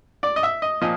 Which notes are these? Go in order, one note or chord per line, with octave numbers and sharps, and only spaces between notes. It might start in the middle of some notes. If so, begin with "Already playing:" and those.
D5
D#5
E5
D#5
A#2 F3 D#5